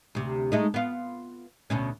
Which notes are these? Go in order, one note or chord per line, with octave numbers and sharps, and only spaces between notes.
D2 C3
G#3 A3 D#4
B3 F4
D2 B2 C#4